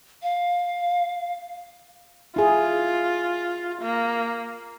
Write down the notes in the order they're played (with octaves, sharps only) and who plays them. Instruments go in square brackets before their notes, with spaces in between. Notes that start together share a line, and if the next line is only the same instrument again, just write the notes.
[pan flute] F5
[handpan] E4 G#4 [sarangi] F4
[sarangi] A#3